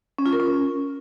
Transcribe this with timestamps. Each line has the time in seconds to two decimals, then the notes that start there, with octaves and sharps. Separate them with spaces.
0.19 C#4
0.26 F4
0.33 A#4
0.40 C#4